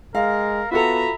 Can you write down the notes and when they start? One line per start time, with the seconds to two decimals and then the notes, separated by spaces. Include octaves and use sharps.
0.15 G#3 A#4 F5
0.71 B3 F4 F#4 A4 E5 A#5 B5